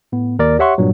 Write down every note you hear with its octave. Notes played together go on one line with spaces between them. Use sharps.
A2 B3
D#2 A#4 D5 A#6
G4 C#5 E5 F#5 C6 C#6
G2 A#2 F#3